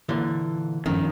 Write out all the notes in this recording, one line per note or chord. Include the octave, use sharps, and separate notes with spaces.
A#2 D3 E3
G2 D#3 F3 C#4